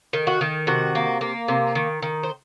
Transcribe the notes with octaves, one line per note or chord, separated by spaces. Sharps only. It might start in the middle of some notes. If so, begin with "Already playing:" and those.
D#3
F#4
D#3
C3 F#4
A#3
A#3
C3
D#3
D#3
C5